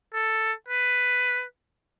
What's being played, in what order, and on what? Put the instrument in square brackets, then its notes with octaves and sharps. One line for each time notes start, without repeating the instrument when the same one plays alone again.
[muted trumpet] A4
B4